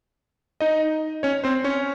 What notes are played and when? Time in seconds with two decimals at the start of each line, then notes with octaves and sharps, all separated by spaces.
0.60 D#4 D#5
1.23 C#4 C#5
1.44 C4 C5
1.64 C#4 C#5